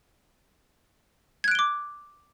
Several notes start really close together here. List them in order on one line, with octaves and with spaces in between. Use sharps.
G#6 F#6 D7 G7 D6